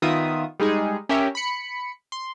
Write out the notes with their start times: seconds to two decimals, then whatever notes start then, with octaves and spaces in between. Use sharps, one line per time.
0.02 D#3 B3 F4 E5 D#6
0.60 G3 G#3 D#4 G#4
1.09 C#4 G4 A#4 E5
1.35 B5 C#7
2.12 C6